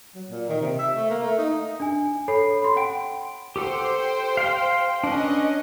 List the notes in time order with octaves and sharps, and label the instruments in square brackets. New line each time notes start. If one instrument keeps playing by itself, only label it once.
[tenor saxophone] F#3
A#2
D#3
C3
E5
A3
A#3
A3
D#4
[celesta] D4 G#5
A4 C#5 B5 C7
B5 C6
F#5 G5 D7
[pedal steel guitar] G4 A4 F#5 [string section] C5 G5
[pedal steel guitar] F5 C6
[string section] C#4 D#5 [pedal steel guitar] D4 B4